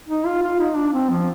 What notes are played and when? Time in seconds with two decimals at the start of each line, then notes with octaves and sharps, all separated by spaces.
0.08 D#4
0.26 F4
0.43 F4
0.59 D#4
0.76 D4
0.93 C4
1.10 F3